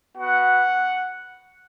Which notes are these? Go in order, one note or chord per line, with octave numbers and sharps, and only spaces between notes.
B3 F#4 F#5